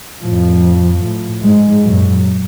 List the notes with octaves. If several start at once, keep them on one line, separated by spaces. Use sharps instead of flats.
F2 A2 F3
A2
G#2 G#3
F#2 A#2 F#3